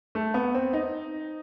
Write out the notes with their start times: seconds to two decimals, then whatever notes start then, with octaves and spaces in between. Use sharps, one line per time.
0.15 A3
0.34 B3
0.54 C4
0.73 D#4